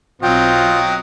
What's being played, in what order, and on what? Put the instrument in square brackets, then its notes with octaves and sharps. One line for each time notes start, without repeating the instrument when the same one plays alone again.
[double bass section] B1 C4 [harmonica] F#3 D#5 [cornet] F4 [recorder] G5